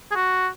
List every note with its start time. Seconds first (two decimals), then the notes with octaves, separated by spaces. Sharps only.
0.11 G#4
0.15 F#4